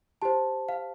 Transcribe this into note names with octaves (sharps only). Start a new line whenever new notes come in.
G4 C5 A5
F5